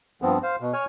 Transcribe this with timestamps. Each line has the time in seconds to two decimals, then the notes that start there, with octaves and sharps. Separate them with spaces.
0.22 G2 F3 B3 C4
0.43 C5 F5
0.60 B2
0.73 C#5 G#5 F6